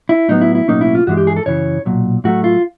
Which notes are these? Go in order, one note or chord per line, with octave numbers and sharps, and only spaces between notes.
E4
A2 F#3 B3 D#4
E4
E4
B1 A2 F#3 A#3 C#4 D#4
E4
F4
G2 E3 G#3 F#4
G4
G#4
A4
F#2 C#3 E3 C#5
B1 A#2 F#3
A2 F#3 A3 F#4
F4